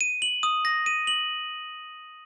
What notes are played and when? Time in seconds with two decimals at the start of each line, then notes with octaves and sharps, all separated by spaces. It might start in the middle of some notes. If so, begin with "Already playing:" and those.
0.01 D#7
0.22 F#7
0.43 D#6
0.65 A#6
0.86 D#7
1.07 F#7